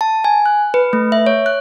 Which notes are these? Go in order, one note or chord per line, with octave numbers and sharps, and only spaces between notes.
A5
G#5
F#6
B4
A3
E5
C#5
F#6